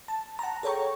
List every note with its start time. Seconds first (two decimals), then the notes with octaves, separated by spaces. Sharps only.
0.08 A5
0.39 F#5 A5 A#5
0.63 G#4 A4 C#5 G5 A#5 C#6